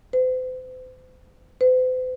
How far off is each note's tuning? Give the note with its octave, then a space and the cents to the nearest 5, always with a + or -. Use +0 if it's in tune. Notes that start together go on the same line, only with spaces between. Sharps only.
C5 -40
C5 -45